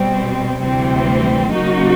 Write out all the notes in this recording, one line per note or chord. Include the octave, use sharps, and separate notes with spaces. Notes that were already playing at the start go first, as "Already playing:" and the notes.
Already playing: B2 G3 C4
D2 C3 E3 G3 C4
C#3 F#3 A#3 D#4 F#4